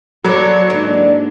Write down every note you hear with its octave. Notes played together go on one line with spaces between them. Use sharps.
F#3 F#4 A4 B4 C#5 D5
G#2 D3 E3 A#3 D4